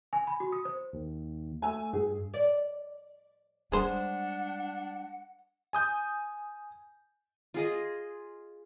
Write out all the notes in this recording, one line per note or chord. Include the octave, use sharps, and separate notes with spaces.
G#5
B5
F#4
D#6
C5
D#2
A3 G#5 E6
G2 G#4
D5
G3 G#3 D4 G#4 C5 F#5
G#5 D#6 G6
F4 G#4 D#5